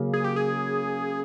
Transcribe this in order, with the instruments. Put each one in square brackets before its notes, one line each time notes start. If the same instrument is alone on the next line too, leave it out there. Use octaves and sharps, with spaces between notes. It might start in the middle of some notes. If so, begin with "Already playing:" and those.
Already playing: [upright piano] C#3 F#3 A#3 C#4
[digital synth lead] G#4
G4
G#4